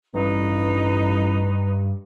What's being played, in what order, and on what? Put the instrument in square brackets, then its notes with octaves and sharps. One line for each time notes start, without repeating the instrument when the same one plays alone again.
[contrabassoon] A1 [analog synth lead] G2 [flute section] D#4 B4